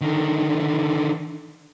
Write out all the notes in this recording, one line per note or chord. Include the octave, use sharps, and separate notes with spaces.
D3 D#3